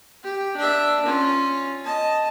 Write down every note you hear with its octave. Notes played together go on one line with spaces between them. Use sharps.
G4
D4 E5
C#4 F4
D#5 A5